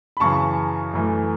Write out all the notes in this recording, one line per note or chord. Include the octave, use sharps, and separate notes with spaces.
B5
F#2 C#3 E3 A5 C#6
F#2 E3 A3